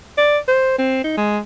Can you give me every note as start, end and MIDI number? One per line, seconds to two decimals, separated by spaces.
0.18 0.38 74
0.48 0.77 72
0.78 1.00 60
1.04 1.12 63
1.17 1.39 56